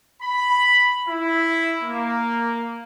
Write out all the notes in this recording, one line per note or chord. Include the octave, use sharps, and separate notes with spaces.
B5
E4
A#3